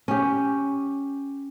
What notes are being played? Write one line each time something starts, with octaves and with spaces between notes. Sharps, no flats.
C#4 G4